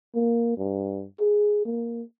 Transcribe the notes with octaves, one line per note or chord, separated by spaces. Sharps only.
A#3
G2
G#4
A#3